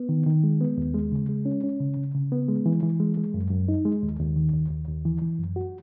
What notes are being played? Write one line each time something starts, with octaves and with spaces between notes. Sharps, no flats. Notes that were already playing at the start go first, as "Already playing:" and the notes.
Already playing: B3
D#3
D#3
G#3
B3
D#2
G#3
C#3
G#3
C#4
C#4
C#3
C#3
C#3
B3
G#3
E3
E3
G#3
G#3
F#2
F#2
D#4
G#3
D#2
D#2
D#3
D#2
D#2
D#2
E3
E3
F#2
F#4